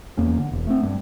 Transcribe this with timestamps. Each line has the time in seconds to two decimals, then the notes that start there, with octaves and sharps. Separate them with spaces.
0.17 E2 A#3 C#4
0.38 D3
0.52 E1
0.67 A3 C4
0.83 G2